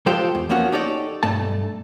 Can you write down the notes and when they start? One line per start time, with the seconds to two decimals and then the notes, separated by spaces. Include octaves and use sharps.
0.06 F3 G#3 F4 G4 A4 C5
0.35 E2
0.49 F3 A#3 B3 C#4 F#4
0.72 D#4 G4 A4 C#5 D5
1.23 B1 G2 A3 A5